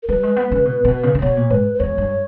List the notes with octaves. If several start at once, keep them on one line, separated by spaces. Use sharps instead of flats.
A#4
G3 B4
G#3
B3
C#3
B2
B2
C#3
C#3
B2 C#5
A#2
G#2 B4
B4
E2 C#5
G2